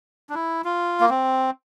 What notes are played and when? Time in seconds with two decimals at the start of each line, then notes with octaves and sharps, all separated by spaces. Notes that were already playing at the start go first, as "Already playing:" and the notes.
0.30 D4
0.34 E4
0.65 F4
1.00 A#3
1.10 C4